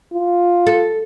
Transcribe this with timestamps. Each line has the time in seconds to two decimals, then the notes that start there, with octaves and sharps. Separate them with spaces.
0.13 F4
0.67 A4